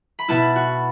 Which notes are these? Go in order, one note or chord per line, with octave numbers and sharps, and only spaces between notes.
B5
B2 B3 E4 A5
F#4